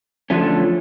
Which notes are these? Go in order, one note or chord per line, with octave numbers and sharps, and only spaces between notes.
D3 F3 A3 C#4